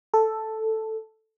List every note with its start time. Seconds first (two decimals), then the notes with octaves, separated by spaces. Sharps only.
0.14 A4